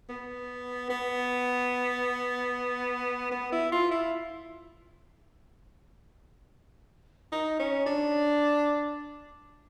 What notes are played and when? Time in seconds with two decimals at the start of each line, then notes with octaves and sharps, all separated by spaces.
0.10 B3
0.90 B3
3.32 B3
3.52 E4
3.72 F4
3.91 E4
7.33 D#4
7.59 C#4
7.86 D4